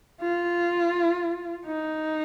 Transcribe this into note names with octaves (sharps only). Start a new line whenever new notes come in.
F4
D#4